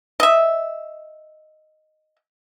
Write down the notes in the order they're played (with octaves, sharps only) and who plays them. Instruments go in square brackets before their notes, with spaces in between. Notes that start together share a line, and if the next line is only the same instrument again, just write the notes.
[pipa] D#5 E5